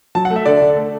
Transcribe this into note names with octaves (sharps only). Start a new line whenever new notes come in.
F#3 A5
F#5
A3
E5
D3 D5
D3
A3